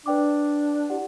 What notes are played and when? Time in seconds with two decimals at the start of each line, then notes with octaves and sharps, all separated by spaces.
0.06 D4 B4 D5 G5 D6
0.90 E4 G4 D5 F#5